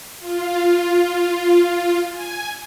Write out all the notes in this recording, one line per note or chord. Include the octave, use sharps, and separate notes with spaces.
F4
G#5